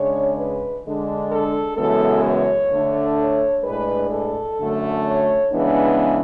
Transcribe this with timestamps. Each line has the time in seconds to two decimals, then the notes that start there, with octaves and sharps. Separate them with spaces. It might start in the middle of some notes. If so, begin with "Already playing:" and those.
Already playing: C#3 G#3 D4 C#5
0.36 B4
0.83 D3 G#3 D4
1.30 A4
1.77 F#2 C#3 E3 G#3 B3 A4
2.24 C#5
2.70 D3 A3 D4
3.17 C#5
3.64 A2 G#3 D4 B4
4.11 A4
4.59 F#2 D3 A3
5.05 C#5
5.52 C#3 E3 G#3 B3 D4 B4